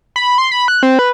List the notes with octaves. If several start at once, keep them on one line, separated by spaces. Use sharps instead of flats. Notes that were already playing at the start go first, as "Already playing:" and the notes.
B5
C6
B5
F#6
C4
B4